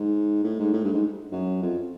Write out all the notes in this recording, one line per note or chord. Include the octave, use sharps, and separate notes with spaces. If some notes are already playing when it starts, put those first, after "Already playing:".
Already playing: G#2
A2
G#2
A2
G2
G#2
F#2
F2